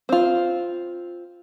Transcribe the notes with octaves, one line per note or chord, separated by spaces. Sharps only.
C4 F4